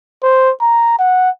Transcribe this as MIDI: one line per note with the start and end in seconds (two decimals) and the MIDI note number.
0.23 0.51 72
0.61 0.94 82
0.99 1.30 78